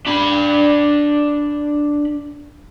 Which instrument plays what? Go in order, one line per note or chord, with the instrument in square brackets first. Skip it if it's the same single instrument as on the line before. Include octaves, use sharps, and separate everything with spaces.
[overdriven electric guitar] D4 B5